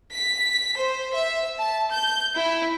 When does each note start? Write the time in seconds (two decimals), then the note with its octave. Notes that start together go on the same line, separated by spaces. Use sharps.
0.12 B6
0.78 C5
1.14 E5
1.59 A5
1.91 G6
2.37 E4